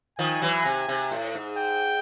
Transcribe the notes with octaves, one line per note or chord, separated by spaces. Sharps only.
D#3 F3 G#5
E3 F#3
C3
C3
A2
G#2
G5